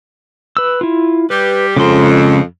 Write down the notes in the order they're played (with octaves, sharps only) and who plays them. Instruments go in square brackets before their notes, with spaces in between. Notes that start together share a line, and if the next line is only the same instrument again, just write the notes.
[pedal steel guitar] B4 E6
E4 F4
[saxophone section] G3 G4 [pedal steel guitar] B4
[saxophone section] F2 [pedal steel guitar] C#3 G#3 C6